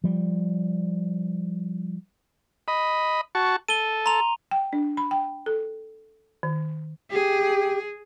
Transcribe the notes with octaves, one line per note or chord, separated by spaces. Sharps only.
F3 G3
D#5 B5
F#4 A5 C#6
A4 D#7 G7
A#5 C6 F7
G5
D4
B5
G5
A4
D#3
G4 G#4